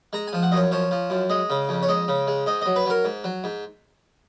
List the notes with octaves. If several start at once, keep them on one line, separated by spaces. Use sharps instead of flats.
G#3 A#5
G#5
F3
F#5
F#2 C#5 D#5
F3 C#5
F3
F#2
G#3 D#5
C#3
F2
C#5
G#3 D#5
C#3
G#3
G#2 D#5
F#3 D#5
B4
F#3 A#4
G#2
F#3
G#2